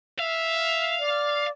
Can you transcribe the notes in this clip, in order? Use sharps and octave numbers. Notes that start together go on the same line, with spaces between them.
E5 F5
D5